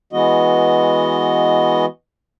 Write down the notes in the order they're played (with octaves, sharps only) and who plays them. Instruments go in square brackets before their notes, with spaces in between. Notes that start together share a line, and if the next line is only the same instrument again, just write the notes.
[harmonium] E3 G#3 B3 F#4 D#5